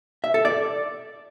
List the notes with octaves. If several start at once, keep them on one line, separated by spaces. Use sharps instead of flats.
E5
A4
D5